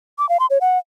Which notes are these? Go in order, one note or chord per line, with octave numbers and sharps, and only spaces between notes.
D6
F5
C6
C#5
F#5